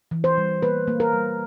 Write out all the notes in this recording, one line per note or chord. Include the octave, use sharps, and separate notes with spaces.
E3
C5
G3
A#3 B4
A#3
A#4
G3